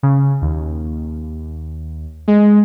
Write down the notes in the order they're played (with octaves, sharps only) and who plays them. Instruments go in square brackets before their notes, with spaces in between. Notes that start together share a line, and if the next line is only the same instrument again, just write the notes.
[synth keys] C#3
D#2
G#3